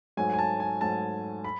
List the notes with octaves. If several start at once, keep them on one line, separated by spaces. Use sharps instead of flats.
G#2 F#3 A3 G#5
G#5
A5
G#5
G#2 F#3 A3 A5
B5